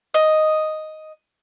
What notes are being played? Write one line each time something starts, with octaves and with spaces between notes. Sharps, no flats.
D#5